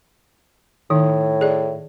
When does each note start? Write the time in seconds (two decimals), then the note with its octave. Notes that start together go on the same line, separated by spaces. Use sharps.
0.90 A2 D#3 D#4
1.41 G#4 D5